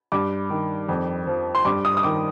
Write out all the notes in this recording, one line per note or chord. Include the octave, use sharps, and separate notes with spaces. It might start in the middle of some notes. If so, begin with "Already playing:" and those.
G2 D6
D#3
F2
F3
C6
G2 D6
D#6
D#6
D#3 D6